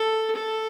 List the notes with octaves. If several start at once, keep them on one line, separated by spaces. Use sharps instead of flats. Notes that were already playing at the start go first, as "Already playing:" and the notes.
Already playing: A4
A4